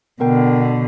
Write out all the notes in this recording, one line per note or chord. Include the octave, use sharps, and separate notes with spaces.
B2 D3 B3 A#4 G5